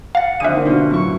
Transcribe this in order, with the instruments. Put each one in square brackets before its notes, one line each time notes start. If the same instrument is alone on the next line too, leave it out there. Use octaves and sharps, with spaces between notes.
[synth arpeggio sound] F5 A6 [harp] F#5
[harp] F2 D3 [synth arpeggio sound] E5 G#5 D#7 [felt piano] D#6 F#6
[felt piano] D#3 A#3 D4
[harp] B2 F4 [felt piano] D3
[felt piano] F#2 A2 [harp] E3 C#6